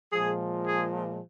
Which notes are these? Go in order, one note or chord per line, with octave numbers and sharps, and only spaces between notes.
A#2 F3 G#3 G#4
G#4